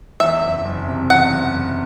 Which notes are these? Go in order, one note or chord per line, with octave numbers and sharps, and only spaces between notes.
E2 E5
F#1
F#1
C3
E2 F#5
F#1
F#1